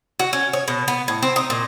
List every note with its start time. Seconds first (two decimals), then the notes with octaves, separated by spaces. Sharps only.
0.19 F#4
0.33 C#4
0.53 C#5
0.68 B2
0.88 B3
1.08 A2
1.22 C4
1.36 D#4
1.50 A#2